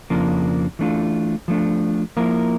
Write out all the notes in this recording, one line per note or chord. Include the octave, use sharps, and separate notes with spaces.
F2 C#3 F3 A#3 D4
E3 A3 D4 F4
F3 A3 D4
F3 A#3 E4 A#4